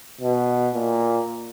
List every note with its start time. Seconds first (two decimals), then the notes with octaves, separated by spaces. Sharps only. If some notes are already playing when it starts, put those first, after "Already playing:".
0.21 B2
0.74 A#2